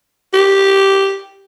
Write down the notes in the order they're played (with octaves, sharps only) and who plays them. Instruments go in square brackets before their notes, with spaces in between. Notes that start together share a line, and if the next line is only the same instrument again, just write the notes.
[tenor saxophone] G4